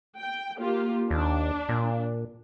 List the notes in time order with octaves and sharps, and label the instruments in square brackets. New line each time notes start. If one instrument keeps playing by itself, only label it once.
[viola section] G5
A#3 F4 G4
[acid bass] D#2 [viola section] D4
[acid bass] A#2